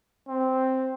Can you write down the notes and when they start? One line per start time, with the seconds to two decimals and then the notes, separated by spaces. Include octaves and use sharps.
0.28 C4